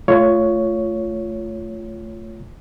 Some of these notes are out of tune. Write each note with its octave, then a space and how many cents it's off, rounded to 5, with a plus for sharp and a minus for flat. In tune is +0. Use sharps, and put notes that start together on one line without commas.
A3 +0 F4 -10 C#5 +10